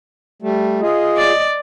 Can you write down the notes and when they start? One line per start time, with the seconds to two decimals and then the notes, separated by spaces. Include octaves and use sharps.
0.42 G3 A3
0.81 F4 G#4 D#5
1.17 D5